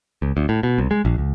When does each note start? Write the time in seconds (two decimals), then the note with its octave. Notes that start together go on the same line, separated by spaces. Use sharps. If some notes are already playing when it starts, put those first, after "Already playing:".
0.22 C#2
0.37 D2
0.49 A2
0.63 B2
0.78 C2
0.91 G#3
1.05 A#1
1.18 C#2